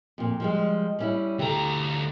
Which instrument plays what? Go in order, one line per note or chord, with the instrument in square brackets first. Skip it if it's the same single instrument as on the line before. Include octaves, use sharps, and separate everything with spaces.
[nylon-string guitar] F2 A#2
F3 G3 G#3
G3 C#4 E4
[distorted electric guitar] D2 A#5 [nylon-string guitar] G4 A4